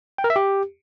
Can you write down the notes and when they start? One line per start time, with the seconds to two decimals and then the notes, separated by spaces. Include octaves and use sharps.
0.18 G5
0.24 A#4
0.30 E5
0.36 G4